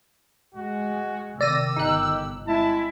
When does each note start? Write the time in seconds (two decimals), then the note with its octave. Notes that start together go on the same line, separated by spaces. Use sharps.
0.54 G#3 F#4
1.41 C3 D#3 D5 E6 A#6 D#7
1.76 G1 D#4 G4 F#6
2.47 G#3 C4 E4 A5